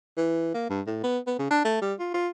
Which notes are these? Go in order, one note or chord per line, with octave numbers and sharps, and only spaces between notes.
E3
A#3
G2
A2
B3
B3
C#3
D4
A3
G3
F4
F4